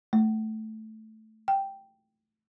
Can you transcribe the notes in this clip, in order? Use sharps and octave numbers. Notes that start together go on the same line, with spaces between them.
A3
G5